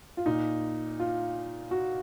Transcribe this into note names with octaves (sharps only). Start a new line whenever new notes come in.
F4
A#2 D#4
F4
F#4